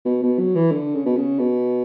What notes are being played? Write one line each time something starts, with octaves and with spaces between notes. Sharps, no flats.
B2
B2
F#3
E3
D3
C#3
B2
C#3
B2